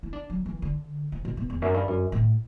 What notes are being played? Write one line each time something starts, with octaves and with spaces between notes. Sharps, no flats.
E4
D4
F#3
E3
D3
C3
B2
B2
E2
F#2
G2
F#2
A2